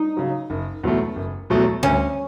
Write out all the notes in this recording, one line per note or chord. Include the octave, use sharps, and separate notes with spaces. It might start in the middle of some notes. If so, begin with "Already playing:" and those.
Already playing: D#4
C#3 F#3
F#1
E2 B2 F#3 A3
F#1
E2 B2 F#3 A3
D2 C#4